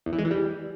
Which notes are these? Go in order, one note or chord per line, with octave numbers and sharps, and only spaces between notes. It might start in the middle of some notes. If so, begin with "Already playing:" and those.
E2
E3
G#3
E3
G3